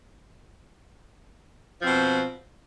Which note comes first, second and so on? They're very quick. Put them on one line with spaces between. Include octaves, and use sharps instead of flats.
F3 C4 B2